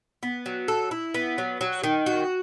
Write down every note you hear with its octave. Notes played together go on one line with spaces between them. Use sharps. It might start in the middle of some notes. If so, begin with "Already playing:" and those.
B3
F#3
A4
E4
B3
F#3
F#3
D#3
F#4